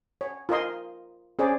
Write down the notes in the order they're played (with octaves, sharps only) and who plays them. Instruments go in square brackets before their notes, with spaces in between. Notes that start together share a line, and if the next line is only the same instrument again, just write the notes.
[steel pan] C#5
F4 A#4 D#5 C6
C#4 G#4 C5 D5